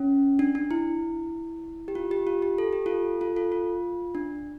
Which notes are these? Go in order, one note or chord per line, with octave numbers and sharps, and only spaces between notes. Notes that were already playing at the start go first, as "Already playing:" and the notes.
Already playing: C#4
D4
D4
E4
G4
F4
G4
F4
G4
A4
G4
F4 A4
F4 A4
F4 A4
F4
D4